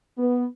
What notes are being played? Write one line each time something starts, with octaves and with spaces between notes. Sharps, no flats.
B3